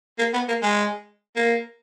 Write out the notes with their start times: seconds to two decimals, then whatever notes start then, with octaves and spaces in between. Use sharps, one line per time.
0.19 A#3
0.33 B3
0.48 A#3
0.62 G#3
1.36 A#3